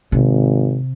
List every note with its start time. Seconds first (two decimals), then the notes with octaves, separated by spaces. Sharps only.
0.12 G#1 C3